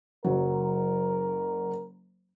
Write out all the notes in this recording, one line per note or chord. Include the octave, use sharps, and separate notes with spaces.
F#1 F#3 A#4